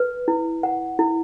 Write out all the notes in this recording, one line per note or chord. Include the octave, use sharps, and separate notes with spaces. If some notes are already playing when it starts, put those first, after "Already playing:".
Already playing: B4
E4
F#5
E4